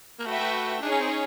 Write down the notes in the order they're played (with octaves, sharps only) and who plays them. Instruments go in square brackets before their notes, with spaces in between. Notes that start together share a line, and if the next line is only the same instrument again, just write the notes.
[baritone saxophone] A#3
[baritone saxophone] A3 [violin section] F#4 B4 E5 G5
[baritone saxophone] A3
[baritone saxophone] D4 [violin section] D#4 G#4 C#5
[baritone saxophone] C#4
C4
C#4